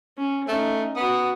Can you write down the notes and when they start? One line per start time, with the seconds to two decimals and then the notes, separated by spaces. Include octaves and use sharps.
0.18 C#4
0.48 A3 C#4 D#4
0.96 B3 F#4 D#6